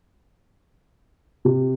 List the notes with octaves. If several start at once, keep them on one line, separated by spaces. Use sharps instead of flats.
C3